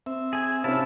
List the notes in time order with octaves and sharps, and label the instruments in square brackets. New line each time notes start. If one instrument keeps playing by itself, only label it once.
[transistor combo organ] C4 E5
[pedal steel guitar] G#4 G#5
[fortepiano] C3 C4 C#4 [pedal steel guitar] E4 A5 [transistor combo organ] F5 E6